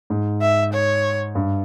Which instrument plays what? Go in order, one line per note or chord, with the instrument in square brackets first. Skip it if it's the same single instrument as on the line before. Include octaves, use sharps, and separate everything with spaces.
[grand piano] G#2
[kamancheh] E5
C#5
[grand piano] G2